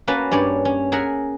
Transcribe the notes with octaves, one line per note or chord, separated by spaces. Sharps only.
A#3 C#4 F#4 B4 A5
G2 C#4 C#5 D5
C#4
G#4 A#4 E5 F#5 A#5